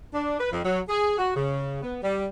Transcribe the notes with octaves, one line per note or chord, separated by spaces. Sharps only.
D4
B4
F2
F#3
G#4
F#4
C#3
B3
G3